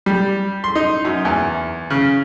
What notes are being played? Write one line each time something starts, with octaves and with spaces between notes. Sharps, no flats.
G3
C6
D#4
F#2
E2
C#3